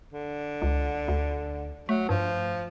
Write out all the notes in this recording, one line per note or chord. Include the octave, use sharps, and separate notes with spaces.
D3
C#2
D2
F#3 A3
G2 F3